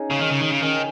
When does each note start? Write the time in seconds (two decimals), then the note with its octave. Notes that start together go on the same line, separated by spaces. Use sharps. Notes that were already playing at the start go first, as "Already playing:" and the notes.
Already playing: C#4 D#4 G#4
0.11 C#3
0.20 D#3
0.31 C#3
0.41 D#3
0.51 C#3
0.62 D#3 C#4